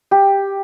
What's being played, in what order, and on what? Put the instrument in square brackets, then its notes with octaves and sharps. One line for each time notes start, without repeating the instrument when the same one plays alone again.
[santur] G4